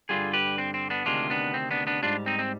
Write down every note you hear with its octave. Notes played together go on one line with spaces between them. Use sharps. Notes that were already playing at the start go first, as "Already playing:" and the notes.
G2 D3 G3 F4 G#4
G4 B4
C4
C4
B3 D4
D2 C3 D#3 G#3 D4 F4
B3 D4
C4
B3 D4
B3 D4
G#2 G3 D4 F4
C4 D#4
C4